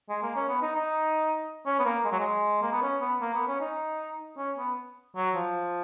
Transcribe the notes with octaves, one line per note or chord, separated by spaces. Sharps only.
G#3
A#3
C#4
B3
D#4
D#4
C#4
B3
A#3
G#3
F#3
G#3
A#3
B3
C#4
B3
A#3
B3
C#4
D#4
C#4
B3
F#3
F3